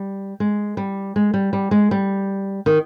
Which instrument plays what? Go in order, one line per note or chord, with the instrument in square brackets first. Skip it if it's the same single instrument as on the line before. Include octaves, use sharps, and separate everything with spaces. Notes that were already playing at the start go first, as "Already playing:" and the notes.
Already playing: [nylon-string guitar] G3
G#3
G3
G#3
G3
G3
G#3
G3
D#3